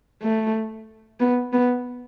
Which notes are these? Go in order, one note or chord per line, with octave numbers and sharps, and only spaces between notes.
A3
B3
B3